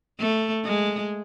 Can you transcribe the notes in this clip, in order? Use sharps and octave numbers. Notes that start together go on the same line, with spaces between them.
A3
G#3